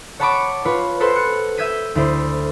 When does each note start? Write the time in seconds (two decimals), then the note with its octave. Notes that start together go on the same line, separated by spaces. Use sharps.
0.19 C#5 F#5 A5 B5 C#6 D6
0.65 F4 B4 C#5
1.00 F#4 A4 B4 C5 C6
1.15 F#6 C#7
1.57 E5 G6 G#6 B6 D#7
1.95 D2 E4 C5